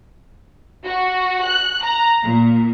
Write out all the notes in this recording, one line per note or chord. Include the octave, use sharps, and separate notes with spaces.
F#4
F#6
A#5
A#2